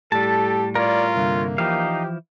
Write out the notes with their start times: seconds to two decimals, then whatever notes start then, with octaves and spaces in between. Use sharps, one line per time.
0.12 A2 G3 G4 A4 A5
0.75 F4 A#4 C#5 D5
1.16 C2 G2 D3 A#3
1.58 E3 F3 D#4 E4 G4 F5